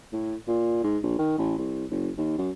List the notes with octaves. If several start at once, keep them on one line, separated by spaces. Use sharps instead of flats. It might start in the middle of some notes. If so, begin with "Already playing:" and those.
A2
A#2
G#2
A#1
D#3
A1
C2
F#1
D#2
F#2